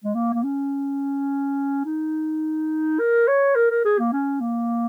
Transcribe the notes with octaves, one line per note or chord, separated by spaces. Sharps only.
G#3
A#3
A#3
C#4
D#4
A#4
C#5
A#4
A#4
G#4
A#3
C#4
A#3